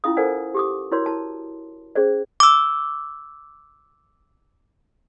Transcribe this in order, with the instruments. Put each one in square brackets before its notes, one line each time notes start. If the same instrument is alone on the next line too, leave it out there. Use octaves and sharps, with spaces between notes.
[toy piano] C#4 E4 F4 F5 D#6
A4 A#4 C5 D5 F#5 G#5
G4 D6 D#6
E4 F#4 A#4 C#5 D5 C6
E4 A5
C#4 G#4 C5 D5
[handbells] D6 E6